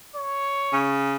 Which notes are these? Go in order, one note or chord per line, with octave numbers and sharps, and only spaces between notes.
C#5
C#3